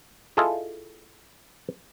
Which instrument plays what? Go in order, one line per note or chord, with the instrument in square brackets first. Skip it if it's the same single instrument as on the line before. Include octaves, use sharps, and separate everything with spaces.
[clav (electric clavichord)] E4 F4 G#4 A4 D#5